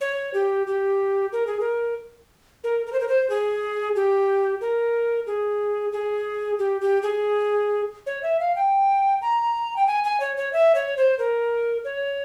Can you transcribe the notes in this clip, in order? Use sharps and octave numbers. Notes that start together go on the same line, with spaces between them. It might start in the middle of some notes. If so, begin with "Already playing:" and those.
C#5
G4
G4
A#4
G#4
A#4
A#4
A#4
C5
A#4
C5
G#4
G4
A#4
G#4
G#4
G4
G4
G#4
C#5
E5
F5
G5
A#5
G5
G#5
G#5
C#5
C#5
E5
C#5
C5
A#4
C#5